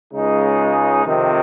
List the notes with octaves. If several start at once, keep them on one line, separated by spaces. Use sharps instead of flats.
C#2 C#3 G#3 D#4
F2 C3 D#3